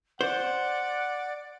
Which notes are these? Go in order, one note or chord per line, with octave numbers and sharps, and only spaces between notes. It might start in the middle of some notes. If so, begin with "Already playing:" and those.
C5 D5 F#5